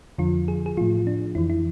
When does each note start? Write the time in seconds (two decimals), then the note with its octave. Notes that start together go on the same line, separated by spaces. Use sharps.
0.18 F2 D3 F3 F4
0.48 G#4
0.66 G#4
0.77 A2 F3 F4
1.07 D4
1.35 F2 E3 E4
1.50 E4